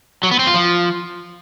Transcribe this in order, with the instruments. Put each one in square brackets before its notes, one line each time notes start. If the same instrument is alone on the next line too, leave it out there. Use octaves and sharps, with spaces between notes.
[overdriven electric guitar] F#3
B3
C4
F4
F3